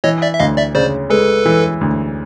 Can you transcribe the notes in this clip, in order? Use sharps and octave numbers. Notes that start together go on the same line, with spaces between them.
E3 C#5 D#5
D5 E5
E5
D2 D#5 F5
D5 E5
C#3 C5 D5
G#3 A4 B4
E3
D2